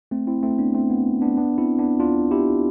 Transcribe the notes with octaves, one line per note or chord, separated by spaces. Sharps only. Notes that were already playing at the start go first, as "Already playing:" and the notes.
A3 C4
C4 E4
A3 C4
B3 D4
A3 C4
B3
B3 D4
B3 D4
C4 E4
B3 D4
D4 F4
E4 G4